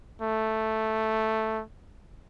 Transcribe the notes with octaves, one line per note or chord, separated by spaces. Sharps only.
A3